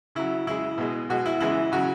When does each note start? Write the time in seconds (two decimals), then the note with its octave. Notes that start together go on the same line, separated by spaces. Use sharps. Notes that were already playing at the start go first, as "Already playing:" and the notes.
0.15 C#3 F#3 E4
0.47 C#3 G#3 E4
0.78 B2 G#3
1.10 B2 G#3 F#4
1.26 E4
1.40 C#3 E3 G#3 E4
1.72 C#3 F#3 F#4